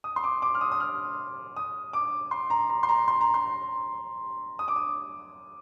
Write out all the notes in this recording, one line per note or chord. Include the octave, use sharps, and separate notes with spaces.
D#6
C6
D6
D6
F6
D#6
D#6
F6
D#6
D6
C6
A#5
A#5
C6
A#5
C6
A#5
C6
D#6
D6
D#6